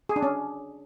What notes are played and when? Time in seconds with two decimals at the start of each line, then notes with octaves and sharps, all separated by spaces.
0.09 G#4
0.16 D4
0.22 C#4